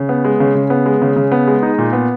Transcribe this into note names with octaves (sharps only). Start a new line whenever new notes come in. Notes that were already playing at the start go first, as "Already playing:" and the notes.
Already playing: C#3
B3
G#3
C#3
C#3
B3
G#3
C#3
C#3
B3
G#3
D#4
A#2
B3